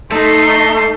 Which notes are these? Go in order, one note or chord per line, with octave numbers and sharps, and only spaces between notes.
A3 D#4 A4 C6